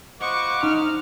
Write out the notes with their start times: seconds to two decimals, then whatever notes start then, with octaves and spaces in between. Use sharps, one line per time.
0.21 F4 C5 D#5 F#5 B5 C#6 D6
0.63 D#4 F6